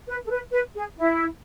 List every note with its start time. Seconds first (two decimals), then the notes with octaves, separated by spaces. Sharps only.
0.08 B4
0.25 A4
0.30 B4
0.52 B4
0.75 G#4
0.97 E4